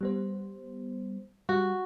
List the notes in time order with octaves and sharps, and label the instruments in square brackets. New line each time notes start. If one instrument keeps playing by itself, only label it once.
[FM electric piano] G3 B3 C5
[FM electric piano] G3 [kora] F#4